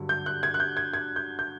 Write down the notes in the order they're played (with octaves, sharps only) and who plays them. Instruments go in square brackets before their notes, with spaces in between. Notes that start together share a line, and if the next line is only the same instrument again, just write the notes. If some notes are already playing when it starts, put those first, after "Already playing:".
Already playing: [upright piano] G2 D3 F#3
G6
F#6
G#6
F#6
G6
G#6
G#6
G6
G6